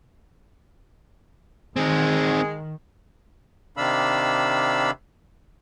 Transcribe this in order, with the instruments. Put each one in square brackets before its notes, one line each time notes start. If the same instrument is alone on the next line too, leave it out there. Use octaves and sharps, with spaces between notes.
[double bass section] D#3 [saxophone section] G#3 G#4 [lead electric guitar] C4 D#4
[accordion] C3 D#3 D4 F5 B5 E6